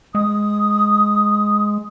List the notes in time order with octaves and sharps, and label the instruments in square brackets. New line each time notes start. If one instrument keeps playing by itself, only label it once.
[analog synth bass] G#3 [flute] D#6